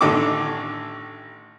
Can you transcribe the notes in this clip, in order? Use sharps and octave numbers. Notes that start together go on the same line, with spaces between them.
A1 D3 D#3 A4 D6